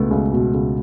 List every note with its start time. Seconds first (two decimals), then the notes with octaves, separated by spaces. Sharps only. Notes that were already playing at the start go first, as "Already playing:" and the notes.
Already playing: C#2 B2 A3 B3
0.11 C#2
0.33 B2
0.54 C#2